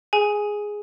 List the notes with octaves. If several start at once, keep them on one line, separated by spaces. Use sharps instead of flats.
G#4 G#5